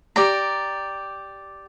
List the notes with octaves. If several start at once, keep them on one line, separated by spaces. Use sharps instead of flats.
G4 D5 A#5